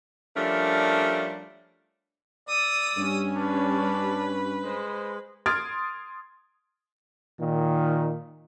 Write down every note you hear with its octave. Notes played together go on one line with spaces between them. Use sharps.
F3 G3 A3 C#4 D4 A#4
D5 D#6 E6
G2 G3 C#4
D4 B4
G#3 C5
C6 D#6 F6 G#6 A6 D7
A#2 D#3